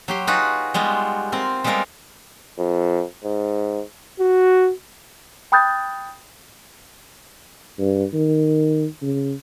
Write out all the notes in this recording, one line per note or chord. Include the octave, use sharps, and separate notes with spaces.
F#3 G4 C6
D#4 F4 F#4 G#4 B4
G3 G#3 B3 F4 F#4
C4 F4 A#4
G3 G#3 B3 C4 F4 A#4
F2
G#2
F#4
G5 B5 D#6 F#6 G6 A6
G2
D#3
C#3